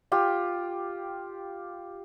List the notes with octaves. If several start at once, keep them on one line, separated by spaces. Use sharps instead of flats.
F4 G4